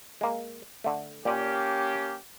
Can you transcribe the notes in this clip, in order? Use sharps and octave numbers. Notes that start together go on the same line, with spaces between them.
G#3 A#3
D3 A3
A#2 A#3 C#4 G4 D5 G#5